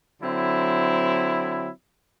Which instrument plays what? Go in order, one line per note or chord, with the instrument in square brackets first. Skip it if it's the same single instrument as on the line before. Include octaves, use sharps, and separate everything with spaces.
[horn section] D3 F#3 C4 E4